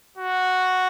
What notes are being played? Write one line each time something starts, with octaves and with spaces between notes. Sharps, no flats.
F#4